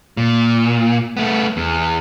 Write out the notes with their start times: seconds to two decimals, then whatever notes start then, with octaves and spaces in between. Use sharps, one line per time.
0.17 A#2
1.17 A3 B3
1.57 E2